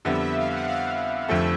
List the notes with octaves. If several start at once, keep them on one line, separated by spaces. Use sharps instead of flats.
F2 D3 G3 B3 E5
E5
F5
F#5
F5
F1 F2 D3 F3 A3 E5